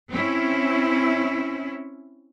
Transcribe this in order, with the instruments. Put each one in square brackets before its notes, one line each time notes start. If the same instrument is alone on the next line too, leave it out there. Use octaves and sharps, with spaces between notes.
[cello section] C4 C#4 E4